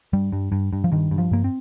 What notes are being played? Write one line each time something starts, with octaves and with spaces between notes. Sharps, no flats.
G2 G3
G2
G2
G2
F3
G2 D#3
G2
F3
G2 A#3
C4